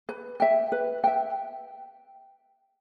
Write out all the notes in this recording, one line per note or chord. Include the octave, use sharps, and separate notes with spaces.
B4
E5 G5
B4
E5 G5